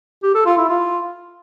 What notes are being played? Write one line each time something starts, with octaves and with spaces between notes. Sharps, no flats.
G4
A4
F4
E4
F4